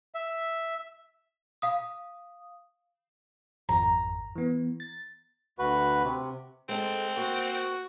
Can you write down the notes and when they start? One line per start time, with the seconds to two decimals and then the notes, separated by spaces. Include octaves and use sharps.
0.14 E5
1.62 F5 D#6
3.69 G#1 F2 A#5
4.35 E3 B3
4.80 A6
5.59 D2 F#4 B4
6.04 C3
6.69 G#3 C4 A4
7.17 A#3 F#4